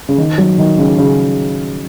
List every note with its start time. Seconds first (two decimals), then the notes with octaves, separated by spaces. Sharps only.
0.09 C#3
0.18 D#3
0.38 F#3
0.58 D#3
0.78 C#3
0.98 C#3